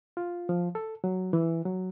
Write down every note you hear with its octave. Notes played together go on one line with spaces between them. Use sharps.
F4
F3
A4
F#3
E3
F#3